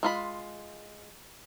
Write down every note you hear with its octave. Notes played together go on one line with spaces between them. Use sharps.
G#3 F4 B5